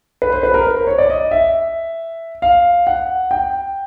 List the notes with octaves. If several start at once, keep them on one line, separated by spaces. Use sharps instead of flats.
B4
C5
B4
A#4
C5
C#5
D5
D#5
E5
F5
F#5
G5